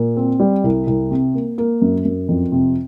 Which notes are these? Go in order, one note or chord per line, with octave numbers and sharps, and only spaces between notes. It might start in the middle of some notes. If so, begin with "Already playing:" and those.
Already playing: A#2
C4
G3
C2
C2
C3
A#3
A#3
F#2
F#2
F2
C3